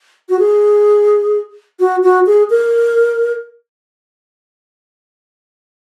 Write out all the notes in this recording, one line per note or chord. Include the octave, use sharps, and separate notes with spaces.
F#4
G#4
F#4
F#4
G#4
A#4